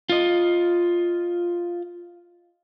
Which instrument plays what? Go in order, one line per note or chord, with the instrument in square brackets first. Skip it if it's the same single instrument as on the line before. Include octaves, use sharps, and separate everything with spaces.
[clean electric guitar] F4 D#5